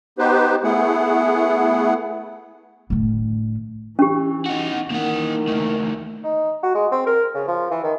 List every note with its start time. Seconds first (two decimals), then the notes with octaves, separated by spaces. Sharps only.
0.19 B3 D#4 G4 B4 C5
0.64 A3 B3 E4 G#4 F#5
2.90 A2 D3
3.99 E3 C#4 G4
4.46 D#4 F#4
4.91 D#3 E3 A#3 F#5
5.48 D#2 A3
6.24 D#4
6.63 F#4
6.75 G#3
6.92 C4
7.07 A#4
7.35 C#3
7.48 F3
7.71 E3
7.84 D#3